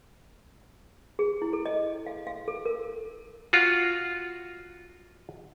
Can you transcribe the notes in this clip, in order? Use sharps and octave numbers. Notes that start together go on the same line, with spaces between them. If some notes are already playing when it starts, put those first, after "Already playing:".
G#4
E4
A4
D#5
F5
F5
A4
A#4
F4 F#4